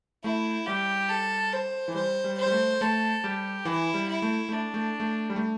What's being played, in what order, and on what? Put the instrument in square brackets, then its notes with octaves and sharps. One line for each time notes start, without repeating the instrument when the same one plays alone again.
[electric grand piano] A3 [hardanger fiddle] E4
[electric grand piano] G3 [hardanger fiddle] G4
[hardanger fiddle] A4
C5
[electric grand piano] E3
[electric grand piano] G3 [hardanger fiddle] C5
[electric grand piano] G3
[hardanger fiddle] C5
[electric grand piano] G3
A3
[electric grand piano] A3 [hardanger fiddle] A4
[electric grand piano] G3 [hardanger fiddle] G4
[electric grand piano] E3 [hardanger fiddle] E4
[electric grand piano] G3
[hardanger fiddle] E4
[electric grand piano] A3
[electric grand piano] A3 [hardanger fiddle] D4
[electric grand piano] A3
A3
G3
A3